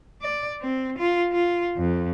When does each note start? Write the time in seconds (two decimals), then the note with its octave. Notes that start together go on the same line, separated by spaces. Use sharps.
0.22 D5
0.61 C4
0.98 F4
1.32 F4
1.77 F2